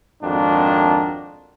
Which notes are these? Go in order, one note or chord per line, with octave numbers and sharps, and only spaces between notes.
G#1 F2 D4 F#4 A#4